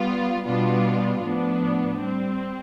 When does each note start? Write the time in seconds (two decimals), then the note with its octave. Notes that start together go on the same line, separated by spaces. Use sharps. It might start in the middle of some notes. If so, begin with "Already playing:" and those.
Already playing: G3 B3 F4
0.45 B2 G3 B3 D4 F4
1.23 A2 F3 B3 D4
2.00 G3 C4